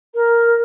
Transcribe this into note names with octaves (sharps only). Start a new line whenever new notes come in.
A#4